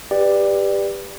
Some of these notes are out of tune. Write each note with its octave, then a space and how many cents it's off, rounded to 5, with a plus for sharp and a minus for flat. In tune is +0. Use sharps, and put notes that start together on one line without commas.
G4 +15 B4 +0 D5 +5